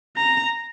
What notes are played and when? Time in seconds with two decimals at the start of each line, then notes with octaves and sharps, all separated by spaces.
0.17 A#5